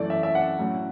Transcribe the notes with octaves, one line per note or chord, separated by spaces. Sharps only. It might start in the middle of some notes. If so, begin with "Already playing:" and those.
Already playing: F#2 E3 A3 D5
E5
E5
F#5
A2 F#3 C#4